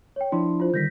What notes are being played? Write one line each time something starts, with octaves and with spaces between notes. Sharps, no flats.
C#5 G5
F3 D4 E4 C6
F4 C5
D3 D#3 G3 G6 A#6 B6